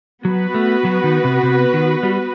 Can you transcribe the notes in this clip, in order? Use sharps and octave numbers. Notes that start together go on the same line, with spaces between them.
F#3 B3 F#4 B4
A3
F#3
D#3
C3
C3
D#3
G3